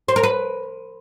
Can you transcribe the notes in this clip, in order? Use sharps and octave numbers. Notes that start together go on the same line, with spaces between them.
C5
A#4
B4